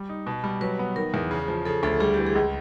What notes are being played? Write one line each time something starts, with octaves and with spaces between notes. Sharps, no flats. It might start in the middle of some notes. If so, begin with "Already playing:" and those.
Already playing: G3
D#4
B2
G3
F#3 B4
B3
D#3 A#4
E2
C#3
F3
C#3 A4
D2 A4
G3 G#4
E3 G4
G#4
C#2